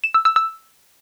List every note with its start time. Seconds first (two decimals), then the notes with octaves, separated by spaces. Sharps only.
0.04 E7
0.14 E6
0.25 E6
0.36 E6